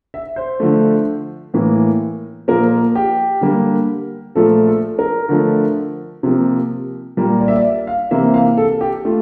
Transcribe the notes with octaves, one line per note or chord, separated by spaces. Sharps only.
E5
C5
D3 F3 A3
A2 E3 A#3
A#2 F3 A#3 A#4
G4
D3 G3 A#3
A#2 F3 A3 A4
A4
A#4
D3 F3 A3
C3 F3 A#3
A#2 G3 A#3
D5
E5
D5
F5
C3 E3 A#3 E5
F5
A4
G4
A3 F4